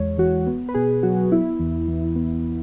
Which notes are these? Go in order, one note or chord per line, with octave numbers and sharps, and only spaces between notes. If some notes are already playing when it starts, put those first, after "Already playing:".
Already playing: E2 G#3 C#5
E3 F#4
B3
B4
B2 G#4
F#3 F#4
B3 E4
E2
E3
B3